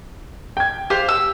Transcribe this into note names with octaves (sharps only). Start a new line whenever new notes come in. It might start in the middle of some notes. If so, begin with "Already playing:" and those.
G5 G#6
G4 C5 F5
E6